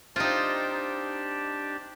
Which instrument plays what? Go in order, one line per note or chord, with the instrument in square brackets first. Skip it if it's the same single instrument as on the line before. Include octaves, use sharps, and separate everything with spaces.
[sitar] C4 [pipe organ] D4 G4 A5 [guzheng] D#4 F4